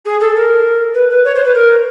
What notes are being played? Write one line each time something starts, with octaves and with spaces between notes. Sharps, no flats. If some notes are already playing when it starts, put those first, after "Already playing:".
G#4
A4
A#4
B4
B4
C#5
C5
B4
A#4